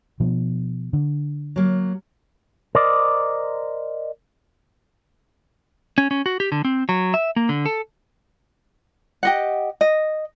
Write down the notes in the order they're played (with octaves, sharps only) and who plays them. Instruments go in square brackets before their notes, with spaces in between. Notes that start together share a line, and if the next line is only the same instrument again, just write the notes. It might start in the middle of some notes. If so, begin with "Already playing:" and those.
[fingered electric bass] B2 F3
D3
[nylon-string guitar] F#3 A#3
[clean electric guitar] A#4 C5 D5 D#5
[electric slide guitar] C#4
C#4
F#4
G4
D3
C4
F#3
E5
A#3
D3
A4
[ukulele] G4 D#5 F#5
D#5